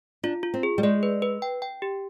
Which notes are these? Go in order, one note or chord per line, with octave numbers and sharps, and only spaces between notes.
D4 F4
F4
C4
G#4
G3
G#3 D5
B4
B4
G5
G5
G4